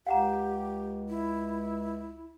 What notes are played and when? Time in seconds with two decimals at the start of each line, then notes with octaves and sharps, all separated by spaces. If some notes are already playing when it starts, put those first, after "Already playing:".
0.07 C#2 G4 F5 F#5 A#5
1.09 E4